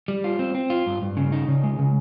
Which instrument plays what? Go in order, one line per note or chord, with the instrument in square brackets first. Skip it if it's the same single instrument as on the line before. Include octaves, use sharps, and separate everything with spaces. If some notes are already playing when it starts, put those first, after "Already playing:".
[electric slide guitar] G3
F4
C4
C4
F4
G2
G2
C#3
D#4
C#3
G#3
C#3